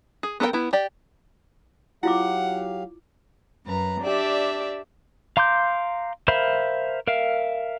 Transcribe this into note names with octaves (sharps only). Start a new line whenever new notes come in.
G#4
B3 A4 A#4 C5 G5
B3 E4
G4 D5
F#3 E4 F4 G4 F5 F#5 D6
F#2 B4 A#5
D4 G4 D5 E5
F5 A#5 C6 D6 G6
A#4 C5 E5 F5 B5
A#4 E5 F5